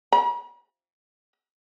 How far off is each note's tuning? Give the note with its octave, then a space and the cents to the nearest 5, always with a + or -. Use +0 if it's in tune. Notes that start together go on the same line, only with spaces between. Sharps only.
B5 -45